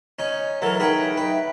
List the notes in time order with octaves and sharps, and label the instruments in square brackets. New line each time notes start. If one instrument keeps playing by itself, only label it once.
[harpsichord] C#4 D#4 C#5
[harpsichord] E3 F#3 A4 [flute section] A#4 A#5
[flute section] D#4 E5 G5 [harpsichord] G#4 B4 C#5
[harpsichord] B4